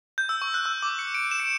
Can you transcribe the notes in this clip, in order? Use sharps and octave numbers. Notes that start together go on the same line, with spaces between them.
G6
E6
C#6
F#6
E6
D6
C#7
D7
E7
C#7